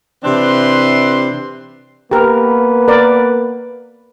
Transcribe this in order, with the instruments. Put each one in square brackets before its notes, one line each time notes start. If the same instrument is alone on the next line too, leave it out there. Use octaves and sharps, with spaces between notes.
[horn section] C3 E3 C4 D4 B4 C6
[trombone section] A#3 B3 B4 [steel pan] G4 A#4
[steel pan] A#4 D5